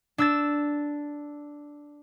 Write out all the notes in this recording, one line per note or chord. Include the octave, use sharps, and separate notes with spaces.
D4 E6 A6